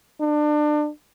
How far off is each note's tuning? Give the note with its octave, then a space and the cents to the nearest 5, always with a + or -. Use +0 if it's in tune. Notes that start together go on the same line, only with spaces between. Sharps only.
D4 +30